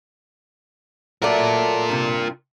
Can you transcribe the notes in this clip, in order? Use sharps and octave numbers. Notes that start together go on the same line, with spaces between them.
F#3 A3 F4 A#4 D5
G2 C3